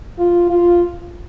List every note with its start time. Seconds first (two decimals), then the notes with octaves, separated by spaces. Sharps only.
0.19 F4
0.50 F4